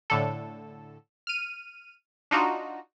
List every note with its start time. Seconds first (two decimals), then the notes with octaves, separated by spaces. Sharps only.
0.10 A2 D3 A4
1.27 F6 D#7
2.31 D4 D#4 F4 F#4